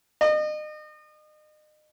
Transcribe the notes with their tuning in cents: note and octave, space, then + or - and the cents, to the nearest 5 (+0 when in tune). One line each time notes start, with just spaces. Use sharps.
D#5 -35